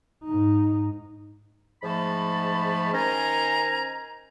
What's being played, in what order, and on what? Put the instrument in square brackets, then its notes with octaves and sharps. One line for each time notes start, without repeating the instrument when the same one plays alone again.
[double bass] G#2 D#4
[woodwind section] G#2 F3 A3 A5 B5
D#3 C#4 C5 G#5 A#5